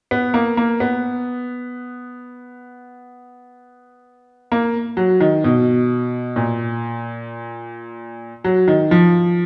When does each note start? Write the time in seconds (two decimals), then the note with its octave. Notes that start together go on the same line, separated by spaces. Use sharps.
0.11 B3
0.34 A#3
0.57 A#3
0.80 B3
4.52 A#3
4.97 F#3
5.20 D#3
5.44 B2
6.36 A#2
8.44 F#3
8.68 D#3
8.91 F3